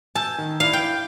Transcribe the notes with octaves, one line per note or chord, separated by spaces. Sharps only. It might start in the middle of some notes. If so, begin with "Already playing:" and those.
G#5 A5 E6 G6
D#3
E4 D5 F5
G5